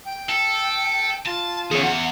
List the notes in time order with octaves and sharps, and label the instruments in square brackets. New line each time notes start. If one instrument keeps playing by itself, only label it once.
[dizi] G5
[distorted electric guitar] A4
[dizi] F4 [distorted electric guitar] A5
[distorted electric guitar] E2 [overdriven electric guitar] G#4 C#5
[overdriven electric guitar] F#5